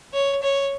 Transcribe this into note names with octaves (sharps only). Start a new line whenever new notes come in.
C#5
C#5